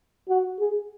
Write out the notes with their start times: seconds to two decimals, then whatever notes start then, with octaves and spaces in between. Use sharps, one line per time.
0.29 F#4
0.59 G#4